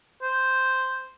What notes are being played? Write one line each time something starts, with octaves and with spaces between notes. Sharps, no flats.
C5